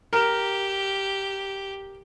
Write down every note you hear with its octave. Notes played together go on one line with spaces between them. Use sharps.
G4 A#4